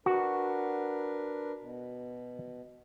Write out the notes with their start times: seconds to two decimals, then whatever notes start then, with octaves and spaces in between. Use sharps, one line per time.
0.06 D4 F#4 A#4 B4
1.59 B2